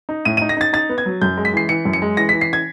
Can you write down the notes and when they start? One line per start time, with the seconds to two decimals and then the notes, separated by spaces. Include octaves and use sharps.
0.09 D#4
0.25 A2 D#7
0.37 D#4 D#7
0.49 A#6
0.57 D#4 A6
0.73 D#4 A6
0.89 B3
0.98 G#6
1.06 F#3
1.22 F#2 G6
1.37 G#3
1.45 B6
1.54 E3 C7
1.69 E3 C#7
1.85 F#2
1.93 C#7
2.02 G#3
2.17 E3 A#6
2.29 E3 B6
2.41 C7
2.53 G#6